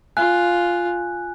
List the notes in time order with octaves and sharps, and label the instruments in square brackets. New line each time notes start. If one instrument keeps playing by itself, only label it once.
[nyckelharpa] F4 [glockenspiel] G#5 F#6